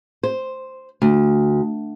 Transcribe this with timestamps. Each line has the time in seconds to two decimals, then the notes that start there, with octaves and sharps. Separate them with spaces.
0.23 C5
1.02 D2